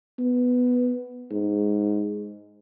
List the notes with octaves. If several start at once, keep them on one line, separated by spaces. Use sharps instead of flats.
B3
G#2